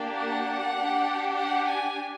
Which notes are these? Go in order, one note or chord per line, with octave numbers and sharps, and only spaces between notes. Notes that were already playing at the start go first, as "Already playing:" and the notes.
Already playing: A#3 D4 G4
F#5
D4 G4
F#5
G#5